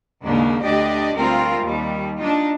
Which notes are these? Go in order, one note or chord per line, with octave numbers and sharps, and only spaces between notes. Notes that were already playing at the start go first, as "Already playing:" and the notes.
D#2 G#2 C#3 A#3 D4
D2 D4 G4 D5 D#5
D2 G3 C4 F4 A#4
D#2 G3
D4 D#4 F4